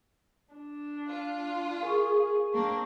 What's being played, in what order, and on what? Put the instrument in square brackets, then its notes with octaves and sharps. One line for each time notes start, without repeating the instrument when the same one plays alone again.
[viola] D4
[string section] F4
[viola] G#4 [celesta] A#4 G#5 C#6
[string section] A#3 C4 D4 [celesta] C#6